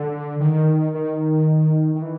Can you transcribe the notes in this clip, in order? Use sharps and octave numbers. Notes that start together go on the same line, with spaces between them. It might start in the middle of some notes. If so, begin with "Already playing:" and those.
Already playing: D3
D#3
D#3
D#3
E3